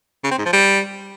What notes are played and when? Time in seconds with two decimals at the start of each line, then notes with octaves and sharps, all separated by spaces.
0.24 C#3
0.31 C4
0.38 G#2
0.46 F3
0.53 G3